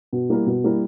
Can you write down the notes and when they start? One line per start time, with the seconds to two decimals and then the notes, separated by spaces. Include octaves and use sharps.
0.13 B2
0.30 G3 A#3 E4 A#4
0.47 B2
0.64 G3 A#3 E4 A#4